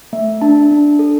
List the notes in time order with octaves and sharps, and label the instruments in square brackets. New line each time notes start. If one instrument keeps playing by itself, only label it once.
[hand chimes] A3 E5
D4 A5
D4
A4